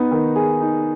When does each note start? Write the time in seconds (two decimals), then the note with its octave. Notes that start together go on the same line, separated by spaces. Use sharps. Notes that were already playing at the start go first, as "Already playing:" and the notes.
Already playing: B3 D#4
0.11 D#3
0.36 G#4
0.60 D#4